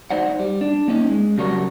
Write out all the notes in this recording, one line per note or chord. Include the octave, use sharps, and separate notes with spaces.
A3 D#4 C5 D5 F#5
G3
D4
A#3 C#4 D#4
G#3
C#3 F#3 G3 F#4 A#4 C#5